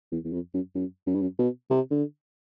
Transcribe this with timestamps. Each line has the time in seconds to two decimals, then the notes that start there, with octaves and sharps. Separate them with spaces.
0.12 E2
0.25 E2
0.33 F2
0.54 F#2
0.75 F#2
1.07 F#2
1.15 G2
1.22 F#2
1.39 B2
1.71 C3
1.91 D3